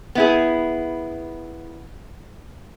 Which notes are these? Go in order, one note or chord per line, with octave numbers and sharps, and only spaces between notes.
B3 E4 G#4